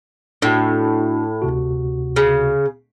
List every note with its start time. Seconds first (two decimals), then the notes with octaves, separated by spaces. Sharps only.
0.42 A2 D4 F#4
1.42 D2 C3 F#4
2.16 C#3